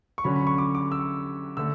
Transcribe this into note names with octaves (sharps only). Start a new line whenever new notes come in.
C#6
D3 F#3 C#4 B5
B5
C#6
D6
D6
E6
D3 A3 E6